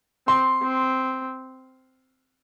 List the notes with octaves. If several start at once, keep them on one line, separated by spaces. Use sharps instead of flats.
C4 C6
C4